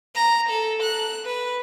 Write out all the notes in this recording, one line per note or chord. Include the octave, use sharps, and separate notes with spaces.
A#5
A4
F#6
B4